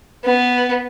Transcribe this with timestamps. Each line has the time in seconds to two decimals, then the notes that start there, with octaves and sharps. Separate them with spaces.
0.25 B3